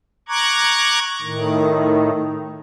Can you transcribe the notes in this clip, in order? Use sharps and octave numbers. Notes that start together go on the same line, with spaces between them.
A#5 C#6 D6 F#6 G#6
A2 D#3